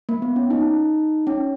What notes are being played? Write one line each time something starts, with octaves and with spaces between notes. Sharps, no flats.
A#3
B3
C#4
D#4
C#4